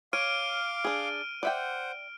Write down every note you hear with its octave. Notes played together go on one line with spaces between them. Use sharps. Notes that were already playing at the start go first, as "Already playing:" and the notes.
C#5 F5 D6 F6 D7 D#7
D4 G#4
C5 D5 E5 F#5 G5